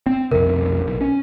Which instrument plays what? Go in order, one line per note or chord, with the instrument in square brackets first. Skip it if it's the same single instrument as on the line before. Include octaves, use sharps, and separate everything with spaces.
[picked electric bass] C4
[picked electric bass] B1 F2 C3 [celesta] A#4
[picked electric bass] B1
C#4